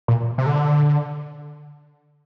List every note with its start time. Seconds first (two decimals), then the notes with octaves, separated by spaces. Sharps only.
0.08 A#2
0.38 C3
0.46 D3